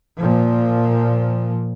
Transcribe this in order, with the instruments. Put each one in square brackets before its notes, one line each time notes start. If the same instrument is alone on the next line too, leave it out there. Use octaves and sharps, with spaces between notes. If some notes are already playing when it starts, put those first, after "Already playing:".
[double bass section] A#2 F3